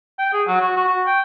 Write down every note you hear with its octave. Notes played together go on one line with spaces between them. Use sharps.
G5
G#4
F#3
F#4
F#4
F#4
G5